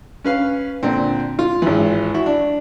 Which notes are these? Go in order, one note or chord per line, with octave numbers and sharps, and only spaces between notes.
C#4 B4 F5
A#2 D3 C4
F4
G#1 E3
E4 F#4
D4